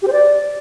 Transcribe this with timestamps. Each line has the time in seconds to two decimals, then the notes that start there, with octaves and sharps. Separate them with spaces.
0.02 G4
0.07 C5
0.13 D5